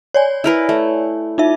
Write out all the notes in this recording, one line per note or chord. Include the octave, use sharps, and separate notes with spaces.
C#5 D5 G#5
E4 A#4 B4
A3
D#4 F4 E5